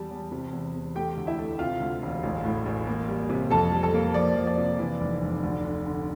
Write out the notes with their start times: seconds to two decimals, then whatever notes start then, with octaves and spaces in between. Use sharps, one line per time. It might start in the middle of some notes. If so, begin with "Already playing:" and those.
Already playing: E2 G3 A5
0.11 E2
0.31 C3
0.53 E2
0.74 E2
0.95 A3 G4 G5
1.17 D2
1.27 E4 E5
1.39 A3
1.59 C3 F4 F5
1.80 D2
2.02 E1
2.23 A1
2.45 A2
2.66 A1
2.87 A#3
3.08 G3
3.30 C3
3.50 F2 A4 A5
3.72 G3
3.83 A4 A5
3.94 A#3
4.14 F3 D5
4.36 F3
4.47 D5
4.58 C3
4.79 E3
5.01 F1
5.22 F1
5.43 D2
5.64 D3
5.85 D3